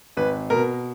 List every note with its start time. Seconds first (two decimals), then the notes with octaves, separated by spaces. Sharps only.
0.17 G#1 B4
0.50 B2 A#4